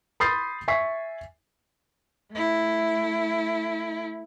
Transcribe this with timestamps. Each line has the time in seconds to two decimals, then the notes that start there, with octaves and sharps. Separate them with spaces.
0.20 B5 C6 D#6 G6 A6 C7
0.68 E5 G#5 C#6 B6 C7
2.32 A3 E4